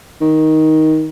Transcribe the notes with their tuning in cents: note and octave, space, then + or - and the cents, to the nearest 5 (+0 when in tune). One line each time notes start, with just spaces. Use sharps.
D#3 +10